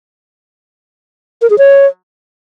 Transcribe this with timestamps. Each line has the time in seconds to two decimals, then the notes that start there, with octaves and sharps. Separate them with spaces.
1.42 A#4
1.50 G#4
1.58 C#5